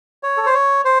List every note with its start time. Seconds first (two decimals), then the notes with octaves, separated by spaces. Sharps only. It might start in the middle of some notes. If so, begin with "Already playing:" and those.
0.23 C#5
0.37 A4
0.46 C5
0.54 C#5
0.85 C5